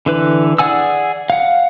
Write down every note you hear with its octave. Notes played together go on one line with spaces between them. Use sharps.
D3 E3 B4
G#4 D5 F#5 G#5 E6
F5 F#5